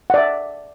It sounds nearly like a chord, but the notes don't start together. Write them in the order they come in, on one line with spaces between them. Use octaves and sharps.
F#5 D5 E5